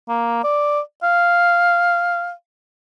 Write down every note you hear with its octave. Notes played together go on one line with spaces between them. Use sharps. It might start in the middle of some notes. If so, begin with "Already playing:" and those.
A#3
D5
F5